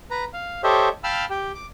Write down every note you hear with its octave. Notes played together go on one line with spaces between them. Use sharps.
B4 A#5
F5
G4 A4 C5 C#5 D#5 E5
F5 G5 A5 B5 E6 F6
G4 G5
D6